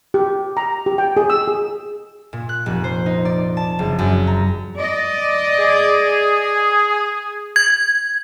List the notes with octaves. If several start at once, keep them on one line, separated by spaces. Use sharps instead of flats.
G4
A#5
G4
G5
G#4
E6
G#4
A#2
F#6
F1
C5
D#4
D5
A5
F#1
F#2
A#5
D5 D#5
G#4
G#6